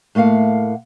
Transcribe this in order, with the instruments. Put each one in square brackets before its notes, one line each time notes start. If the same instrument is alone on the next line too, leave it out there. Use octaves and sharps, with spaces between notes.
[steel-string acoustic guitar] A2 A3 A#3 F5 F#5